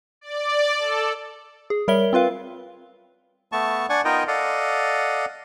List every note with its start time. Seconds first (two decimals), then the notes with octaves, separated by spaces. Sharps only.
0.21 D5
0.79 A4
1.70 G#4
1.88 G3 A#4 C#5 E5 G7
2.13 C4 F4 B4 F5
3.52 A3 B3 A5 C#6
3.90 D4 D5 F#5 G#5 C#6
4.05 B3 D#4 F4 A#4 D#5 G5
4.28 A4 D5 D#5 F5 F#5